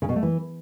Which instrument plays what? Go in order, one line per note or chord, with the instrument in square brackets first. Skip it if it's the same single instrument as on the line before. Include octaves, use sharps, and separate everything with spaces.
[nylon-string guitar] C#3
B2
A3
E3